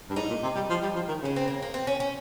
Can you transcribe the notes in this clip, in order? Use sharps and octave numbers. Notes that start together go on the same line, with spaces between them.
G2
G#2 D#4
A#2
C3
G3
F3
G3
F3
D#3
C#3 C#4
C4
A#3
A#3
C4
C#4
C#4